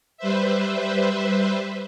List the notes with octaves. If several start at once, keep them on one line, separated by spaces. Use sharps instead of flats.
G3 B4 C5 E5